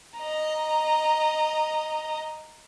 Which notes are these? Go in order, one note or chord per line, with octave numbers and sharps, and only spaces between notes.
D#5 A#5